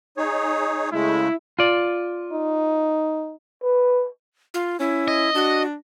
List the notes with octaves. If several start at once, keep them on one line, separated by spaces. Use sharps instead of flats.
D#4 G#4 C#5
C#3 G#3 A3 E4
F4 D5
D#4
B4
F4
C#4 E4
D#5
D4 F#4